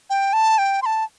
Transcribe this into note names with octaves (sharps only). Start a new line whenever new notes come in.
G5
A5
G5
C6
A5